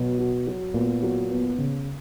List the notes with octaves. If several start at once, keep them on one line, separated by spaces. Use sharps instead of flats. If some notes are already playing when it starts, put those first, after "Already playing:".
Already playing: B2 F#3
F#4
F#3
A#2 B3
F#3
B3
C#3